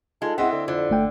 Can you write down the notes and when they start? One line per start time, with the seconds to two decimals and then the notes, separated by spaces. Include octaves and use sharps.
0.22 G#3 D#4 F4 A4
0.38 G#3 C4 E4 D#5 E5 F#5
0.52 D3
0.68 F2 D3
0.90 G1 A3 G5